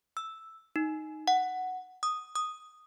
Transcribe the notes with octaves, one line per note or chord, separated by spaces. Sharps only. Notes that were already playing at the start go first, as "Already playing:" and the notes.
E6
D#4
F#5
D#6
D#6